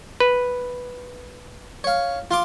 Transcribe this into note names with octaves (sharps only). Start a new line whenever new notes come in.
B4
C#5 F5
F4 C6 D6